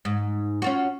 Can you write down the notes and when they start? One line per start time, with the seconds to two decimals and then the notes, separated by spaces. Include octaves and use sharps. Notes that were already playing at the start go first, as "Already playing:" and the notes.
0.05 G#2
0.62 C#4 F4 F#4